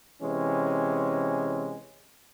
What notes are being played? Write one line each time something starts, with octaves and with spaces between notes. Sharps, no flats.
C3 E3 G#3 C#4